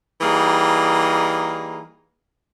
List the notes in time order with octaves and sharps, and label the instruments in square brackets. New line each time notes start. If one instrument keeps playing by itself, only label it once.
[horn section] E3 G3 A#3 D#4 G#4